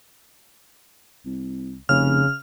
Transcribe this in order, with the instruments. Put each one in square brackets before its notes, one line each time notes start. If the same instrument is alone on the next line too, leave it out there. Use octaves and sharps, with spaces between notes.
[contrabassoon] C2
[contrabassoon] F1 [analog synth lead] C#3 [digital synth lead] F6